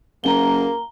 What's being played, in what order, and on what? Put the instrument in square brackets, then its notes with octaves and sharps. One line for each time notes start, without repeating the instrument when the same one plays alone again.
[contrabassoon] F#1 [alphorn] A#3 [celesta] A#5 G7